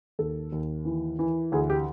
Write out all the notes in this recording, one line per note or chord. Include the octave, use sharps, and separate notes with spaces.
D#2 A4
D#2
E3
E3
D2 G#4
G4